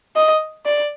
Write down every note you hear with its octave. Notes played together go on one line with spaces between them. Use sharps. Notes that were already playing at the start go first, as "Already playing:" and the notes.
D#5
D5